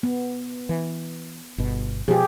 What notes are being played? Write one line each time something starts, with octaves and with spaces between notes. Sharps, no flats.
B3
E3
G1 B2
B2 F3 G4 G#4